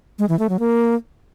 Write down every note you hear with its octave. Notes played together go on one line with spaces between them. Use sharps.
G#3
E3
A3
F#3
A#3